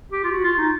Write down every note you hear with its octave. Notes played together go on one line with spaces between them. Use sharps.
G4
F4
F#4
F4
D#4